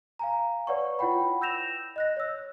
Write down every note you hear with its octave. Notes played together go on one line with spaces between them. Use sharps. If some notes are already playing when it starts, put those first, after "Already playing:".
F5 G#5 A#5
B4 C#5 D5 F#5 C#6
E4 F4 C#5 F#5 G5 B5
E6 G6 A#6 E7 F7
D#5 F#6 A#6
C#5 E6